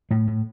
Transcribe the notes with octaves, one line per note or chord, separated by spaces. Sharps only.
A2 A3
A2